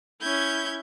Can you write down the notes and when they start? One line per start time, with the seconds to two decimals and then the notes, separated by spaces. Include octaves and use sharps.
0.22 C#4 E4 G6 G#6